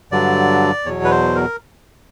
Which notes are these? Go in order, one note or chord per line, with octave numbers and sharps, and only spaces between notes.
G2 D3 F#3 D5
E2 B2 F#3 C#5
B4
C5
A#4